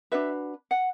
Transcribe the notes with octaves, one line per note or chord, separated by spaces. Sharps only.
D4 F#4 B4 E5
F#5